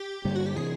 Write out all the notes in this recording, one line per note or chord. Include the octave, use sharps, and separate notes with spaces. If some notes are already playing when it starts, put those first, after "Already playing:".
Already playing: G4
G2 D3 G3 A#3
F#4
G4
C3 E3 G#4